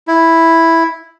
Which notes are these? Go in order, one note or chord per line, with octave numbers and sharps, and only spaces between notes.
E4